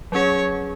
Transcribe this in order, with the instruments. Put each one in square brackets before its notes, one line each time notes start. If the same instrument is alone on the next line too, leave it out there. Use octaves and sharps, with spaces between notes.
[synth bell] F#3 C#4 G#4 [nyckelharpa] C#5